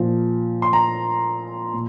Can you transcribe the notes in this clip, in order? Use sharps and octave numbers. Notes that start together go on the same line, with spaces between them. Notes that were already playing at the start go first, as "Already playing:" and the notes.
Already playing: A#2 F3
C6
A#5
A#2